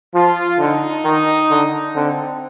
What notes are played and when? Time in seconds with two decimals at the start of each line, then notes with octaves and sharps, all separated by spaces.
0.14 F3 F4
0.59 D3 D#4
1.04 D#3
1.50 D3
1.95 D3 C4